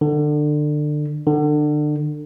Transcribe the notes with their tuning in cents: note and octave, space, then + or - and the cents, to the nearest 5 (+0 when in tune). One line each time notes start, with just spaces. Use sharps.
D3 +25
D3 +30